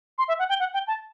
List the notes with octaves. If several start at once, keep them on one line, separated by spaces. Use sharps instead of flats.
C6
E5
F#5
G5
F#5
G5
A5